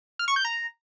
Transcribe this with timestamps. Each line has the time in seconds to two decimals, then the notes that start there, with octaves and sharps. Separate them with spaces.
0.19 F6
0.28 C#6
0.36 G6
0.45 A#5